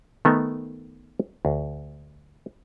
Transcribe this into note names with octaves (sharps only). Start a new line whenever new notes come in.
D#3 A3 B3 D#4
D2